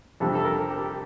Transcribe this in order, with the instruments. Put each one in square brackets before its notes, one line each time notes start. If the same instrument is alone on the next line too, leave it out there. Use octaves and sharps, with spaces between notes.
[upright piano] F2 C3 G3 D4 [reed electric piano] A4
[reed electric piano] A4
A#4
G4